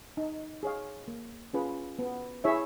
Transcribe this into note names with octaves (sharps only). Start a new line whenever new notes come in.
D#4
G#4 C#5 F5
A#3
C#4 F4 G#4 B4
B3
E4 G#4 C#5 E5